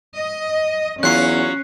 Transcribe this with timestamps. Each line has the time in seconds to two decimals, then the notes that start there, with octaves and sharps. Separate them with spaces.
0.18 D#5
1.03 E2 F#3 C#4 F4 F#6 C7